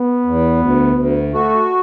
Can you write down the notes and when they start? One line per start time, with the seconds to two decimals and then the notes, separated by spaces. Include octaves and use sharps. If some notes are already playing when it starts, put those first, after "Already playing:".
Already playing: B3
0.25 E2
0.61 D2
0.96 D2
1.32 A3 F#4